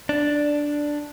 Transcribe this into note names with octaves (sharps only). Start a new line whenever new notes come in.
D4